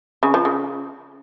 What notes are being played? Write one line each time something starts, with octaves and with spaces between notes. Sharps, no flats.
C#3
F3
C#3